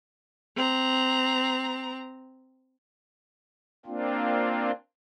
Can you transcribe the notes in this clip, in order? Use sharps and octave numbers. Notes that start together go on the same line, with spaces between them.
C4 A#5
A#3 C4 D4 F4